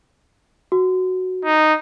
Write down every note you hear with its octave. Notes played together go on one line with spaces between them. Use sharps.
F#4
D#4